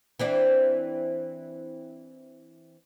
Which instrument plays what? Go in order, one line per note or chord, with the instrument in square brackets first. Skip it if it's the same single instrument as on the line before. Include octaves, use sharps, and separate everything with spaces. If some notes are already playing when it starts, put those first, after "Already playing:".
[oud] E3 C4 D4